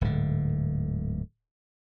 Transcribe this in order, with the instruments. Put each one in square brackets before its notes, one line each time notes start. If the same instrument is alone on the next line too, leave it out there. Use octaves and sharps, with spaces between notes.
[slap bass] D1 G#2 D3